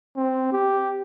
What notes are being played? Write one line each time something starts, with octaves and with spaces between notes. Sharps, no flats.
C4
G4